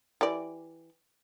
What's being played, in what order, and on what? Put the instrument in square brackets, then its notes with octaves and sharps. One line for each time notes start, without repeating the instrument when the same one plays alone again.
[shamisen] E3 G4 D5